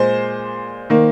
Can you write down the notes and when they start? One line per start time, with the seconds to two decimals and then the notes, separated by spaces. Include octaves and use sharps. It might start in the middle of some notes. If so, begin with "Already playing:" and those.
Already playing: A#2 G#3 C5
0.90 D#3 A#3